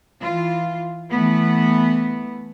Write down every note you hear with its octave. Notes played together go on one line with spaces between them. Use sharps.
E3 F4
E3 A3 B3